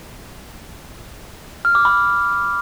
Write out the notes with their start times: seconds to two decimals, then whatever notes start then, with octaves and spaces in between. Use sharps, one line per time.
1.65 F6
1.75 D6
1.85 B5